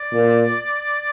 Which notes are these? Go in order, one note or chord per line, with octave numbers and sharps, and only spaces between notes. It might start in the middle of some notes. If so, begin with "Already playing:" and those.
Already playing: D5
A#2